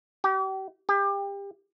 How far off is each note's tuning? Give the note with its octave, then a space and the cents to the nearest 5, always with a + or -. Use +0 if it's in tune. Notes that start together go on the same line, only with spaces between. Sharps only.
G4 -40
G4 +25